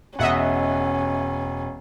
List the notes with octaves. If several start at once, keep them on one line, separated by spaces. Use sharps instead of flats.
E1 C#4 D#5 E5 F#5